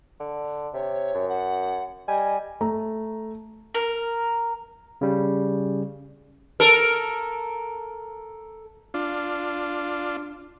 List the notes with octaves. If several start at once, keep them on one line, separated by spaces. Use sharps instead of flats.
D3
C3 C#5
F#2
F#5
G3 D#5 G#5
A3 A#5
A#4
C#3 G3
A4 A#4
D4 F4